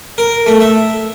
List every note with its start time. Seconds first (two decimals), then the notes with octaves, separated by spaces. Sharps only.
0.18 A#4
0.46 A3
0.60 E5